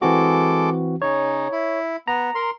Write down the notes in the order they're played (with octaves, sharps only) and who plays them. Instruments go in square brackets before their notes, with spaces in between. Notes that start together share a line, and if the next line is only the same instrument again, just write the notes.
[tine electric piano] E3 C4 F#4 [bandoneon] G#3 A4 D6
[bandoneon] C#3 D#4 [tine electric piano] C#5
[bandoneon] E4
[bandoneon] B3 [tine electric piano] A#5
[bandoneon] A#4 C6